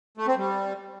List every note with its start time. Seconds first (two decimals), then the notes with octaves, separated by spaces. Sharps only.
0.17 A3
0.27 C4
0.37 G3